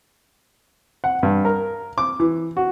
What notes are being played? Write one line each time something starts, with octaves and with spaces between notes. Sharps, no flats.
F#5
G2
A#4
D6
E3
F#4